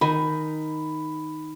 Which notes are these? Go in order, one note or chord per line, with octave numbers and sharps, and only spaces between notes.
D#3 D#4 G#5 B5